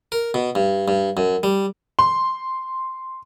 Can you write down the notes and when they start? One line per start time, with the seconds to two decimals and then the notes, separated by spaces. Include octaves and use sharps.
0.12 A#4
0.34 B2
0.55 G2
0.88 G2
1.17 F#2
1.43 G3
1.99 C6